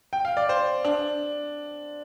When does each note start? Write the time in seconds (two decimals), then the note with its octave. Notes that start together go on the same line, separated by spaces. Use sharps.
0.13 G5
0.25 F5
0.37 D5
0.49 C5
0.85 D4